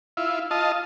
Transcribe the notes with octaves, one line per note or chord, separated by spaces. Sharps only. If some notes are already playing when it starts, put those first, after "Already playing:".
E4 F4
F4 D#5 A5